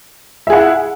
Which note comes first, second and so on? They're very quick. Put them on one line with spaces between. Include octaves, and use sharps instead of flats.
E5 G#4 F#5 E4